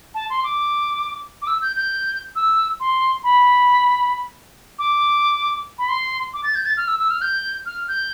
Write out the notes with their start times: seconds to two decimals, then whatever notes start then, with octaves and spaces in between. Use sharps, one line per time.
0.15 A5
0.30 C6
0.44 D6
1.42 D6
1.47 E6
1.62 G6
1.77 G6
2.36 E6
2.80 C6
3.24 B5
4.79 D6
5.78 B5
5.89 C6
6.34 D6
6.44 A6
6.55 G6
6.66 A6
6.77 F6
6.88 E6
6.99 E6
7.10 F6
7.22 G6
7.66 F6
7.88 G6